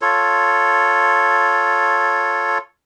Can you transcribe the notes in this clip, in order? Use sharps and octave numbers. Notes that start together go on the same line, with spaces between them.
F4 A4 C#5